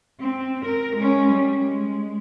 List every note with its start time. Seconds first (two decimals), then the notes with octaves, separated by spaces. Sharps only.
0.19 C4
0.65 A#4
0.96 G#3 C#4
1.30 G3
1.63 G#3